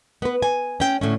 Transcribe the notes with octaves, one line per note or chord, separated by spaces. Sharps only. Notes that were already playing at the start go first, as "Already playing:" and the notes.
B3 B4
G#5
C#4 G5
A2 D3 C#4